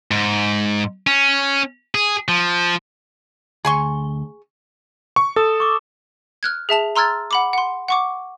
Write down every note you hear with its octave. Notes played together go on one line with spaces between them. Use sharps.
G#2
C#4
G#4
F3
D2 G#4 G#5 C6 C#6
C#6
A4 D#6 E7
C#6 D6
F6 F#6 G#6
G#4 E5 A5 F7
A#5 C6 E6 F6 G#6 A6
F#5 B5 D6
F#5 C6
F#5 C#6 D6